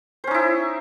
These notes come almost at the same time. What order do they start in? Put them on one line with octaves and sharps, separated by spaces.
C5 C#4 D#4 E4